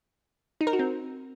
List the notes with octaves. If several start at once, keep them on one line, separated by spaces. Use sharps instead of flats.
D#4
A#4
F#4
C4